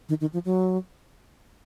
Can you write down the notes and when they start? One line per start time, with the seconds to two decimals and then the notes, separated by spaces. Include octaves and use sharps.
0.09 D#3
0.21 D#3
0.33 F3
0.45 F#3